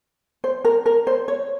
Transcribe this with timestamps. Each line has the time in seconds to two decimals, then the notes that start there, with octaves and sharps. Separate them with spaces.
0.44 C5
0.65 A#4
0.86 A#4
1.07 C5
1.28 C#5